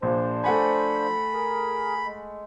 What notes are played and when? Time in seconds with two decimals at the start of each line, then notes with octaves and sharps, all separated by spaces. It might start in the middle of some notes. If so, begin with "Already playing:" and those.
0.02 A#1 F3 D4 C5
0.44 A3 F#5 G#5 B5
1.34 G#4 A#4
2.06 G#3